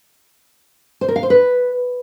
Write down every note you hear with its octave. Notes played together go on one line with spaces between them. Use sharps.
C5
A#4
F5
C5
B4